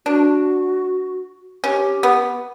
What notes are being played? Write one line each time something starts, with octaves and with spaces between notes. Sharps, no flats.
D4 F#4
C#4 G4
B3